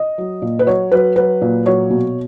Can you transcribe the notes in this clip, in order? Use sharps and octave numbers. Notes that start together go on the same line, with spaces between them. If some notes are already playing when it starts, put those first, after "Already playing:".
Already playing: D#5
F#3
A#2
B4
F#3 C#5
F#3 B4
F#3 B4
A#2
F#3 C#5
B2